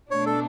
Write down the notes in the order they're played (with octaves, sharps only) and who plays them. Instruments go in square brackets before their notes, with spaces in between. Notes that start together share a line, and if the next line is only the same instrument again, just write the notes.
[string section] B2 A3 D4 [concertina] C#5
[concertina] A4